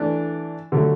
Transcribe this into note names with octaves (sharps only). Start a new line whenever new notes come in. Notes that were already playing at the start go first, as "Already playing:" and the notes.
Already playing: E3 A3 D4
D3 F#3 A3